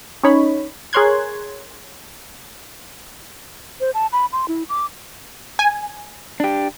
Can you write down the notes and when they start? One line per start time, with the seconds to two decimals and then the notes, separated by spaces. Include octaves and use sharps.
0.23 C#4 D#4 C#5 B5
0.93 G#4 A#4 C#5 C6 F#6 G#6
3.80 C5
3.94 A5
4.13 B5
4.33 C6
4.48 E4
4.69 D6
5.59 G#5
6.40 D4 G4